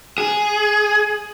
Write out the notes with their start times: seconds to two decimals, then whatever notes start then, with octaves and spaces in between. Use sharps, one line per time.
0.18 G#4